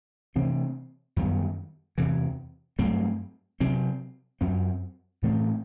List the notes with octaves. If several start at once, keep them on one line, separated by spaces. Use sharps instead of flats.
C3 E3 A3 C4
F#2 D#3 G3 B3
E2 C3 E3
G2 F#3 A3 C4
C3 F#3 C4
F#2 F#3 C4
A2 E3 A3 C4